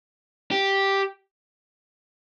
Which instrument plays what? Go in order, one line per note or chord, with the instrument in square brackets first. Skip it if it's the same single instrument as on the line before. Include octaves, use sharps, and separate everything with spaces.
[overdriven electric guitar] G4